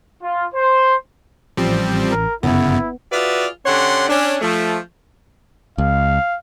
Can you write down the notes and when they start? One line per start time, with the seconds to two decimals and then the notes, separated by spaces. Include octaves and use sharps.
0.22 F4
0.53 C5
1.57 A1 F3 G3 C4
2.12 A#4
2.43 G1 F#2 C#3 B3 E4
3.12 F4 F#4 G#4 B4 D5 E5
3.66 D3 C#4 G4 C#5 F#5 C6
4.09 C#4 D4
4.41 F3 A3
5.78 C#2 F5